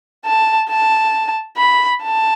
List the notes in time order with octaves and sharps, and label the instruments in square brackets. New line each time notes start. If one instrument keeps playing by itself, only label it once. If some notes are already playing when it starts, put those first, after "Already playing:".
[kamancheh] A5
A5
B5
A5